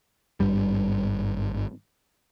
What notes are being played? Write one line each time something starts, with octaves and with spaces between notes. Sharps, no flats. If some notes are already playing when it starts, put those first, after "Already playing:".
G#1 G2 G3